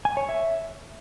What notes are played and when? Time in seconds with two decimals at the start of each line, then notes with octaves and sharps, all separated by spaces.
0.05 G#5
0.17 C#5
0.29 E5